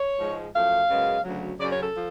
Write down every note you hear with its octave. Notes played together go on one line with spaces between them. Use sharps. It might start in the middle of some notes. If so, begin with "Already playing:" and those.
Already playing: C#5
G#2 F3 G#3
F#2 F3 A3 F5
F#2 C#3 G#3 B3
D2 C#3 F#3
F#2 C#3 F#3 D5
C#5
A4
F3